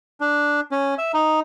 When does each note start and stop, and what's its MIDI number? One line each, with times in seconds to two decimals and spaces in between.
0.20 0.60 62
0.72 0.94 61
0.98 1.12 76
1.14 1.40 63